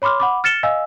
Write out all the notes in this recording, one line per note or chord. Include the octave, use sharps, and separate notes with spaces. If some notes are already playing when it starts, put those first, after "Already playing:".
C#5 B5 C6 D6 F6
F#5 B5 D6
F6 A6 C#7 E7 G7
D#5 F5 G#5 E6